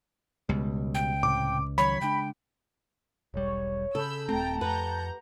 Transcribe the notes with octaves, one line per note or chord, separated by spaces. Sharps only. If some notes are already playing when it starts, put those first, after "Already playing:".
C#2 B2 G3
G5
A2 C3 D6
D#3 F#3 C#5 B5
C#3 G#3 D4 G5
E1 B1 G3 C#5
C#3 A4 B5 E6 G6
D#1 A3 C4 G5 A5 A#5
F2 G4 B4 F#5 A#5 G6